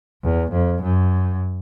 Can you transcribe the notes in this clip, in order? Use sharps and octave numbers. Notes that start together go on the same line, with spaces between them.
E2
F2
F#2